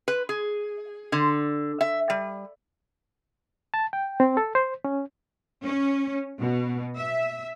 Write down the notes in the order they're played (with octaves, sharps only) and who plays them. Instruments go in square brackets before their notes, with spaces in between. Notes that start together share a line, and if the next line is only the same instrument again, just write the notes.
[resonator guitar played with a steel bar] B4
G#4
D3
E5
G3
[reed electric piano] A5
G5
C4
A4
C5
C#4
[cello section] C#4
B2
E5